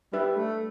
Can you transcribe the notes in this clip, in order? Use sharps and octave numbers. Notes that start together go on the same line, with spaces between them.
G3 D4 B4 E5
A3